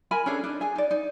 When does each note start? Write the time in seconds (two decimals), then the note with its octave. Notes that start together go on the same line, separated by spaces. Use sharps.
0.11 A#4 G#5 B5
0.26 C#4 D4 G#4 A4
0.44 D4 D#4
0.61 G#4 G#5
0.76 D#4 D5
0.91 D#4